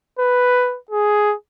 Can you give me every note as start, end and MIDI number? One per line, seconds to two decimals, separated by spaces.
0.19 0.78 71
0.91 1.35 68